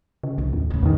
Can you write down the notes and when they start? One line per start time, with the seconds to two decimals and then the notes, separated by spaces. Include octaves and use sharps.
0.24 C#3
0.38 C2 A2
0.53 D#2
0.70 A2 C#3
0.82 E2 D#3